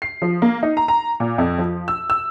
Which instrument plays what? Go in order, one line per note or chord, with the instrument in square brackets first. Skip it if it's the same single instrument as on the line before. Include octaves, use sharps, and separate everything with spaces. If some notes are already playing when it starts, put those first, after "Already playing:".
[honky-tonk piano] C7
F3
A#3
D#4
A#5
A#5
A#2
F2
F3
E6
E6